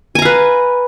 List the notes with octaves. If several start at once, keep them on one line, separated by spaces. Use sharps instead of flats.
B4 F5 G#5 A#5